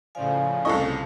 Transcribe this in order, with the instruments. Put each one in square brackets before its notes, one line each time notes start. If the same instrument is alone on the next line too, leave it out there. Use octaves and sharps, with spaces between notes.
[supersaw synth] A2 C#3 F3 [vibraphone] D5 F5 G#5
[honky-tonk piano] C2 A4 D#5 [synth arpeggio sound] E4 C#6